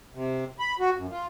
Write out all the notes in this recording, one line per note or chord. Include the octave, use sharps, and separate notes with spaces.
C3
B5
F#4
F#2
F4